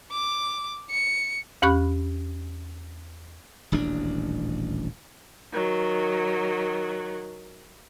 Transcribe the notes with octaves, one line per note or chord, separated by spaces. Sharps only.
D6
C#7
E2 C#4 G4 B5 C#6 F#6
D#1 A1 D2 D4
D#3 F#3